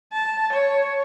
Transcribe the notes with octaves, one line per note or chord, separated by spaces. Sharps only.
A5
C#5